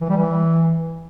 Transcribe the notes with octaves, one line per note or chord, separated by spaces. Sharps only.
E3
G3
E3